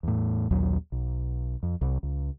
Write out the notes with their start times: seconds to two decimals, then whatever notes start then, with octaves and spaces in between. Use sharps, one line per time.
0.03 E2 A2
0.51 A#1 D#2 F#3
0.92 B1
1.63 F2
1.81 C2
2.03 C#2